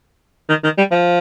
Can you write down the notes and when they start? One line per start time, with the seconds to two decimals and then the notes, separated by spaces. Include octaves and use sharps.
0.49 D#3
0.64 D#3
0.78 G3
0.91 F3